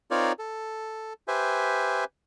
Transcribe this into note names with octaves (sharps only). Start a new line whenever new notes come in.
C4 D#4 F4 A#4 C#5 D5
A4
G4 B4 C5 E5 G#5